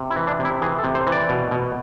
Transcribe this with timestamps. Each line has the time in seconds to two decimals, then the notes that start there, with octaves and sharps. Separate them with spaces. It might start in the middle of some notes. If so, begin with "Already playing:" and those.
Already playing: C3
0.10 E4
0.16 E3
0.27 D4
0.39 C3
0.45 E4
0.61 E3 G#4
0.78 A4
0.84 C3
0.95 C5
1.07 E3
1.12 D5
1.29 B2
1.51 B2